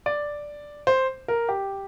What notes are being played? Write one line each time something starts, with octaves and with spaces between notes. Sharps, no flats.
D5
C5
A#4
G4